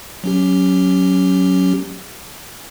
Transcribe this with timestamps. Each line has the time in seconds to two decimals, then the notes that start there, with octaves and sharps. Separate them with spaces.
0.24 F#3 C#4 G4